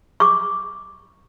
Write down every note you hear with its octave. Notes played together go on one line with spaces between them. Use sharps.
C#6 D6